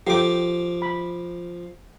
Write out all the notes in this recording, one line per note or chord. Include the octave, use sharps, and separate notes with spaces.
F3 G4 A4 G5 D6
B5